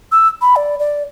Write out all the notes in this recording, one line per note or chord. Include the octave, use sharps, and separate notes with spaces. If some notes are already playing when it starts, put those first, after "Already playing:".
E6
B5
D5
D5